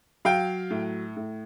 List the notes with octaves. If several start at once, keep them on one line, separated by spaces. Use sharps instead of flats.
F#3 F5 G5
A2
A2